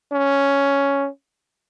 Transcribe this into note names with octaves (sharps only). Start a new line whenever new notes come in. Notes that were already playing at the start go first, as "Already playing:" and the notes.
C#4